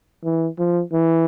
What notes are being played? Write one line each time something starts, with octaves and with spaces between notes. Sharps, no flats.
E3
F3
E3